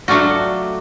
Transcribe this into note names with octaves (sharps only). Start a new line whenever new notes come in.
F#3 A3 D4 F4 F#4